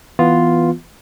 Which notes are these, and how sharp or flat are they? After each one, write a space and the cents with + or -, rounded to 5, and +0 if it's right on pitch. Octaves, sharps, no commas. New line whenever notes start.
E3 +0 B3 +0 F4 +0